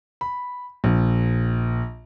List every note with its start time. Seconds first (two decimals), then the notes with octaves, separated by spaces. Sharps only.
0.21 B5
0.84 A#1